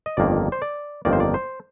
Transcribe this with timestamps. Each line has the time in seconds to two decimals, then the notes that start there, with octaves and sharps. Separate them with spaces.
0.06 D#5
0.17 G1 F2 D#3 A#3 D5
0.52 C5
0.62 D5
1.05 G1 F2 D#3 A#3 D5
1.13 C5
1.20 D5
1.34 C5